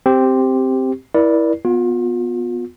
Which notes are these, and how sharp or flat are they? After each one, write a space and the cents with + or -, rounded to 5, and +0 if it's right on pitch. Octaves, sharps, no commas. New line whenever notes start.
C4 +0 G4 +0
E4 -10 A#4 +40 D5 +0
B3 +0 F4 +35